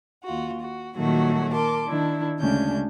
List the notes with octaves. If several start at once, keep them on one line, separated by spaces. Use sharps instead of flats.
D#2 F4 F#4
F#4
A#2 D#3 F#3 G3 A3 F#4
A#4 A5 C6 D6
D#3 D4 E4
D2 C#3 G#3 C#4 D4 G6